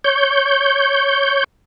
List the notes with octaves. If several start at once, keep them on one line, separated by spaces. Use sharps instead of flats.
C#5 G6